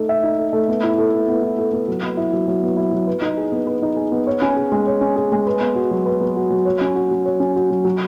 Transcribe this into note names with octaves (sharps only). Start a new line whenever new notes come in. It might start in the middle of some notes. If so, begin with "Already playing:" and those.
Already playing: A3 D#4 A4
E5
D#4
A4
A3
B3
E4
A4
B3
B3
E4
A4
B3
F#3
B3
E4
F#3
F#3
B3
E4
F#3
B4
D#4
G#4
B3
B4
D#4
G#4
B3
C#5
C#4
G#4
G#3
C#5
C#4
G#4
G#3
B4
B3
F#4
F#3
B4
B3
F#4
F#3
C#5
C#4
F#4
F#3
C#5
C#4
F#4
F#3
F#3